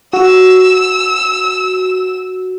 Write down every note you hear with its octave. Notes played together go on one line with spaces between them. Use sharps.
F#4 E6